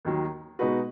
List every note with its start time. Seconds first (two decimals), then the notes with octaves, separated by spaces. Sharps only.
0.05 D#2 D#3 F#3
0.59 B2 G#3 D#4 F#4 B4